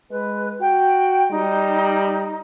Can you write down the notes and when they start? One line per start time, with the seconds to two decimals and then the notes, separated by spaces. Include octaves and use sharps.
0.11 G#3 B4
0.61 F#4 G5
1.31 G3 D#4